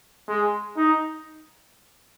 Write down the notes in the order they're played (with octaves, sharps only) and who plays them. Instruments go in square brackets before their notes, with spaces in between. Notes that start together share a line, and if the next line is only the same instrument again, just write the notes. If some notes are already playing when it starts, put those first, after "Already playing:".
[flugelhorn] G#3
D#4